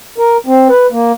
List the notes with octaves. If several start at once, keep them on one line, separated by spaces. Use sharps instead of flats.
A#4
C4
B4
A#3